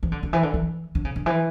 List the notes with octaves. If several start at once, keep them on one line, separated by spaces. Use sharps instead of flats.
E3
D3
D3
E3
D3
E3
D3
C#3
D3
E3